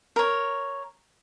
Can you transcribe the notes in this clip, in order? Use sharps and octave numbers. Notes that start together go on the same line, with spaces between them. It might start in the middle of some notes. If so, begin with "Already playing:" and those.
A#4 C#5